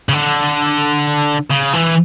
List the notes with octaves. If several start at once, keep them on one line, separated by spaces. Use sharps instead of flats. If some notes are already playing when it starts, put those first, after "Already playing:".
C#3
D3
C#3
E3